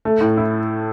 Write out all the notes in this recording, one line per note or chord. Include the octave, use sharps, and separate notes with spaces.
A3
A2
E4